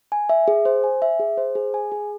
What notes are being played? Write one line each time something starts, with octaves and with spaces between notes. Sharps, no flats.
G#5
E5
G#4
C5
G#5
E5
G#4
C5
G#4
G#5
G#4